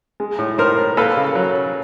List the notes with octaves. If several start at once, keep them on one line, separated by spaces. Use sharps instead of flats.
G#3
A2
A2 A#4 C5
A2
A#3 A4 B4
C#3
F#3